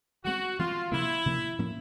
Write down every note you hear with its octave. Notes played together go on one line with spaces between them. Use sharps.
E3 G#3 C4 F#4
E3 G#3 C4 F4
C3 F3 A#3 E4
C3 F3 A#3
A2 F3 A#3 C#4